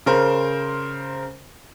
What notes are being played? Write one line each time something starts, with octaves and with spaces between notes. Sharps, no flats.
C#3 A#4 C5